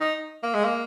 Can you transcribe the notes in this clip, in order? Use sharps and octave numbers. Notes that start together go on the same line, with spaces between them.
D#4
A#3
G#3
A#3